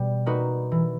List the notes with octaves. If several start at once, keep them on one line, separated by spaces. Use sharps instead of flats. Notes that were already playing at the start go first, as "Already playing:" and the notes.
Already playing: B2 G3 B3
A#3 D#4 F#4 B4
E3